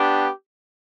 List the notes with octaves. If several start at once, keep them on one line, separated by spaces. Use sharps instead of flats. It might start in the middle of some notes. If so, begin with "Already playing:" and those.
Already playing: B3 D4 G4